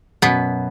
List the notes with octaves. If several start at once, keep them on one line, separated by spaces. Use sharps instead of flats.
F#2 B2 B3